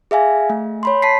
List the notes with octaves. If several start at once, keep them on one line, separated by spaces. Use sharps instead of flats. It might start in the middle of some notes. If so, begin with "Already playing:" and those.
G#4 E5 F5 G#5
A3
C#5 B5 C6
A5 B6 C7